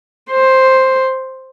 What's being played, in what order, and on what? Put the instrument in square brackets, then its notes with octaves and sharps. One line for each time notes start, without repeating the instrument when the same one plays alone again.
[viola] C5